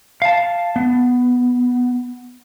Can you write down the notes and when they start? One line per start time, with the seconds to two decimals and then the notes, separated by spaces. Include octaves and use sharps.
0.22 F5 A5
0.76 B3